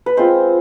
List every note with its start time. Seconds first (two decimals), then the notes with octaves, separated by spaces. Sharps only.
0.06 B4
0.17 G#3 C4 F4 C5